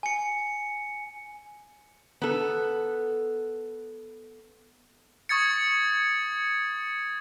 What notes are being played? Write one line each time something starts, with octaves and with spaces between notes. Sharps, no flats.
G#5 C#7
B3 A4
C#6 D#6 G#6 A6 C#7